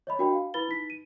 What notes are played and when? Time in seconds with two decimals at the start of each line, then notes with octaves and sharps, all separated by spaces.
0.07 C#5 D#5 B5
0.19 D4 F#4 A#4 G5 B5
0.33 F5
0.54 E4 B4 B5 A6 G7
0.68 D#4 B6
0.90 D#7